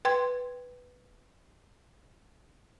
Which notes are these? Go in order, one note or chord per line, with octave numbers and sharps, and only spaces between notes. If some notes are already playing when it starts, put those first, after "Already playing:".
B4 G5 C6 G#6